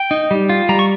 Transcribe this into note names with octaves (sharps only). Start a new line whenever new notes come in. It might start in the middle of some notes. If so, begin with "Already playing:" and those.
Already playing: G5
D#4
G3
F4
G3 A#5
C#6